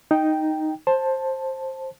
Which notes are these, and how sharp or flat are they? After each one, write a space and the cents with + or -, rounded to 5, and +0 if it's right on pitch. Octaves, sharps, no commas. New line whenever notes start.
D#4 +0 G5 +0
C5 +15 A5 +0